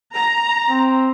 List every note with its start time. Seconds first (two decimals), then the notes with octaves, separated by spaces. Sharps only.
0.14 A#5
0.69 C4